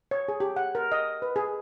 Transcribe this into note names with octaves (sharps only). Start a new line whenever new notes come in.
C#5
G#4
G4
F#5
A#4
D#5
B4
G#4